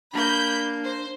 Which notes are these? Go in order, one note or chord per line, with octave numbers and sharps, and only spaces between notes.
A#3 D4 B5 G6
C5